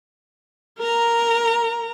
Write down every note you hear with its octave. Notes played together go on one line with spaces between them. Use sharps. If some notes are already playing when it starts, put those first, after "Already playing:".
A#4 A#5